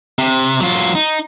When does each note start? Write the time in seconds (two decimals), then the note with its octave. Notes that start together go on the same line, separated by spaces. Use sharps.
0.18 C3
0.60 F#3 F4
0.95 D#4